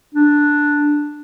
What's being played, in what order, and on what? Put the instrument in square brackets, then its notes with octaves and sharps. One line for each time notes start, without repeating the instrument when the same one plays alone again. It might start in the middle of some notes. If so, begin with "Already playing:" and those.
[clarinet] D4